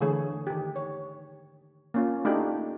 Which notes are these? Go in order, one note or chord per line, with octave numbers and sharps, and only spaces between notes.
D3 E3 A3 G#4 C#5
D#3 G4
C#5
A#3 C#4 F4
A3 D4 D#4 F#4 G4